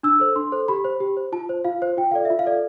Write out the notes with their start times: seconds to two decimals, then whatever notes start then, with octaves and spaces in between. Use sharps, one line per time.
0.03 D4 E6
0.20 A4 C5
0.36 D4 C6
0.52 A4 C5
0.68 G4 B5
0.85 C5
1.00 G4
1.17 C5
1.32 F4 A5
1.49 C5
1.65 F4 F5
1.82 C5
1.97 F4 G5
2.11 A4 D5 F5
2.25 E5
2.30 F4
2.39 F5
2.46 A4 D5